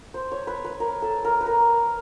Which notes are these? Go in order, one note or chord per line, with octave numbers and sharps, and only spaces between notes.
C5
C#5
B4
B4
A#4
A4
A#4
B4
A#4